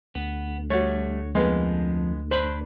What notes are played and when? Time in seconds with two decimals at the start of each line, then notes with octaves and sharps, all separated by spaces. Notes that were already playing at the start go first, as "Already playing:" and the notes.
0.15 D2 B3
0.70 G3 A3 F#4 C#5
1.35 F2 F3 G#3 A#3 B3
2.31 B4 C5 D5 B5